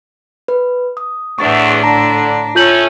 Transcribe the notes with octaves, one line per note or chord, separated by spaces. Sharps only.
B4
D#6
E2 A2 D4 C#6 A6
D3 A5 A#5 A#6
A2 A3 C#4 F4 G6 F#7